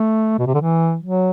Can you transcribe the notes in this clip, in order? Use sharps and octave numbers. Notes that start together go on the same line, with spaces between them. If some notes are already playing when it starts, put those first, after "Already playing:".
Already playing: A3
B2
C3
D3
E3
F#3